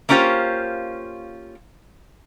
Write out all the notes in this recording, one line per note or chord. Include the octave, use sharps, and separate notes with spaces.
A#3 C#4 D4 F4 G4 C5